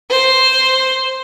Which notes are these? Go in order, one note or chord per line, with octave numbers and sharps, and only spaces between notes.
C5